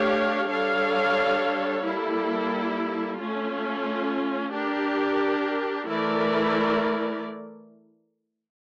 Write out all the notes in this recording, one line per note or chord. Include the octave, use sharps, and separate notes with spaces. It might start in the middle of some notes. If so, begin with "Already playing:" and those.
Already playing: A3 D4 G4 C#5 F5
G3 D4 A4 C#5 F5
G3 A#3 E4 A4
A3 C#4 F4
D4 G4 A#4
E3 A3 E4 A#4 D5